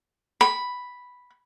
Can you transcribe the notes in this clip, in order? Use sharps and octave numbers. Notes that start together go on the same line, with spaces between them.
B5